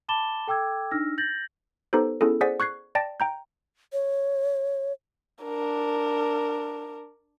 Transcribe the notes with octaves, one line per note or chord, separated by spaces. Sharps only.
A5 B5 D6 A6 E7 G7
A4 G5 D6 E6 G#6
D4 D#4 E6 F6 A#6
G6 A6 A#6 F#7
B3 D#4 G4 A4 B4 C5
B3 C#4 E4 G#4 A4
G#4 C5 D5 F#5 G#5 B6
C#6 F#6 G#6 C7
D5 G5 A5 A6 A#6 D7
G5 A#5 G6
C#5
D4 A#4